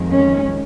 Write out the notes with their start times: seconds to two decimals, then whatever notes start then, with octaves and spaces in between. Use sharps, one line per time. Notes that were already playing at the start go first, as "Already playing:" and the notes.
Already playing: F2 D#3 G#3
0.15 C#4